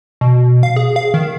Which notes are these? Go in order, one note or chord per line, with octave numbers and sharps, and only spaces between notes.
B2
F5
G#4
F5
D#3